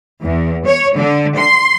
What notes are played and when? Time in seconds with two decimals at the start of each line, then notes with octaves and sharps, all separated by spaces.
0.23 E2
0.66 C#5
0.98 D3
1.38 C6